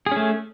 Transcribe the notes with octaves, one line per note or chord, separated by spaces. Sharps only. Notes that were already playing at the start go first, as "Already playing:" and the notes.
A3 C#4 G#4